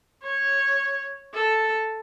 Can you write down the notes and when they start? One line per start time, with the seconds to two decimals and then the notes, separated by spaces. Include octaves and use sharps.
0.24 C#5
1.34 A4